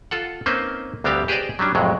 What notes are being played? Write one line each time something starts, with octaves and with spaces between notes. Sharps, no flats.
F4 A4 F#5
A#3 C4 C#4 D#4 B4 C5
D2 G3 B3 C4 G4 F5
G4 G#4 B4 C5 D5 D#5
F#3 G3 C#4 D4
C2 F2 A2 F#3 G#3